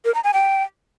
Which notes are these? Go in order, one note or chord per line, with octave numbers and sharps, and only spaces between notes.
A#4
A#5
G#5
G5